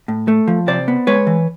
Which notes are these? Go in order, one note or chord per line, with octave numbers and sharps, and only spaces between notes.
A2
A3
F3
C3 C5 D5
B3
G#3 B4 C#5
E3